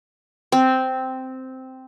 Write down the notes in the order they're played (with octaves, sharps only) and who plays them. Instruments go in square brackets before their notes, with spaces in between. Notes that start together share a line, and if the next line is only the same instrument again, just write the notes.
[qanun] C4